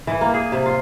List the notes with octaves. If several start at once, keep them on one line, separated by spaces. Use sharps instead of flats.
E3
A#3
G#4
C3
F4